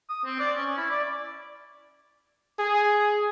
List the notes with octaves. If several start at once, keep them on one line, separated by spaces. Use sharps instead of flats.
D#6
C4
D5
C#4
E4
D5
G#4